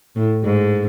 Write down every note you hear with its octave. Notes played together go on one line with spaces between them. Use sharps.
A2
G#2